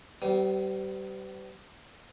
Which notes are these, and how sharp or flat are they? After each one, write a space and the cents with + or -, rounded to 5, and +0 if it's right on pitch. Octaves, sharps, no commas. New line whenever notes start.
G3 -25 B3 +45